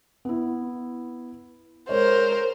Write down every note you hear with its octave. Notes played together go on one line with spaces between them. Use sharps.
B3 E4
G#3 A#4 C5 C#5